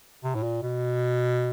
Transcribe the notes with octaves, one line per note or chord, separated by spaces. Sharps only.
C3
A2
A#2
B2